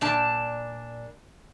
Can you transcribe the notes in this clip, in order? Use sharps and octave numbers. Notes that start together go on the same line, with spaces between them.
A#2 D4 A5